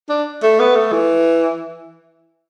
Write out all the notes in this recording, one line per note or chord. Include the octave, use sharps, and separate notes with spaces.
D4
A3
B3
A3
E3